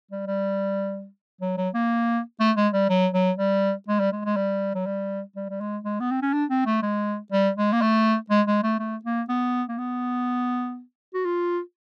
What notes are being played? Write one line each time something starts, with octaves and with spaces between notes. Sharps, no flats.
G3
G3
F#3
F#3
A#3
A3
G#3
G3
F#3
F#3
G3
G#3
G3
G#3
G#3
G3
F#3
G3
G3
G3
G#3
G#3
B3
C4
C#4
D4
C4
A3
G#3
G3
G#3
A#3
A3
G#3
G#3
A3
A3
A#3
B3
A#3
B3
F#4
F4